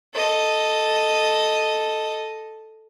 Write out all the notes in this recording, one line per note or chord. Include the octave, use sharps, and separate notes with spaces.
A4 D#5